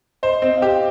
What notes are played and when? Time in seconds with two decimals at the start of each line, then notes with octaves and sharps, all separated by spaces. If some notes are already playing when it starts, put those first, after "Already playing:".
0.23 C5 D#5
0.42 C4 D#5
0.57 F5
0.62 G4 G5